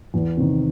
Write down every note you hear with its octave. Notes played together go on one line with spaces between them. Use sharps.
E2
C3 D#3